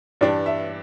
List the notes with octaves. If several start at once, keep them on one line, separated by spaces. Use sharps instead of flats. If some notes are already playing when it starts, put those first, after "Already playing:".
G2 E3 G3 D4 D5
E5